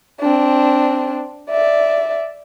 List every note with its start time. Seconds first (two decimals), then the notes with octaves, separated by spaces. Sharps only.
0.20 C4 D4
1.50 D5 E5